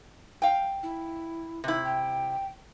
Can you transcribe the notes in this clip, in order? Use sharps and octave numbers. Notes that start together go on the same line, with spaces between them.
F5 G5
E4
C3 E4
G5